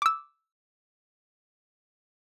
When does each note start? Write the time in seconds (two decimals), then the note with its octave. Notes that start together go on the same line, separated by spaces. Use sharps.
0.02 D6 E6